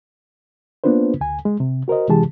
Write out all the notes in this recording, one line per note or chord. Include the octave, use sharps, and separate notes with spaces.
A#3 B3 D4 F4 B4 C5
D2 G#5
G#3
C3
F#4 A#4 C5 D#5
C3 E3 G#3 G4 G#4 A5